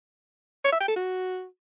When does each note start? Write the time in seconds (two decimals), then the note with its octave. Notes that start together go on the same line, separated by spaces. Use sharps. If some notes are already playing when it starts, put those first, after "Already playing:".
0.65 C#5
0.72 E5
0.80 G5
0.88 A4
0.96 F#4